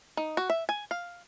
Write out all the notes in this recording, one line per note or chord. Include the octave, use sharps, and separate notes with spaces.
D#4
F#4
E5
G#5
F5